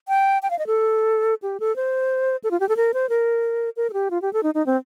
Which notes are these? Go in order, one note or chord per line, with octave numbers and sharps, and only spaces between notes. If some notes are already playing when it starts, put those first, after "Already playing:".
G5
G5
F5
D#5
A4
G4
A4
C5
A4
F4
G4
A4
A#4
C5
A#4
A#4
A4
G4
F4
G4
A4
D#4
D#4
C4